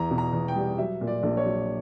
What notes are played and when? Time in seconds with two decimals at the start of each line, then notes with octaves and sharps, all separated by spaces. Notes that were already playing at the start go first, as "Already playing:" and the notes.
Already playing: E2 A#5
0.11 B2
0.18 A#5
0.33 E2
0.48 G5
0.56 G3
0.78 F#3 E5
1.01 A#2
1.07 D5
1.23 A#1
1.37 C#5
1.46 F#3